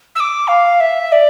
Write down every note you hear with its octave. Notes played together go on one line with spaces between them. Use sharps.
E6
D6
F5
E5
D5